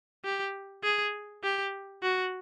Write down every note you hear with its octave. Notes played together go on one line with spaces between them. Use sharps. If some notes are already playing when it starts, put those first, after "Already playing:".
G4
G#4
G4
F#4